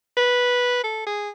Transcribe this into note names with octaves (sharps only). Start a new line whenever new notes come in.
B4
A4
G#4